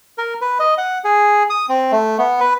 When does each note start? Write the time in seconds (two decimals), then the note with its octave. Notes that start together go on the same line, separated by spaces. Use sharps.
0.18 A#4
0.41 B4
0.59 D#5
0.78 F#5
1.04 G#4
1.50 D#6
1.69 C4
1.92 A3
2.18 B3
2.40 B4